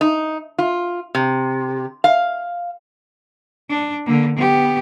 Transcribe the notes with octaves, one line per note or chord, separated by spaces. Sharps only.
D#4
F4
C3
F5
D4
D3 A#3
B3 G4